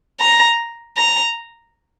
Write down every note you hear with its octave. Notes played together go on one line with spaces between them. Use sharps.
A#5
A#5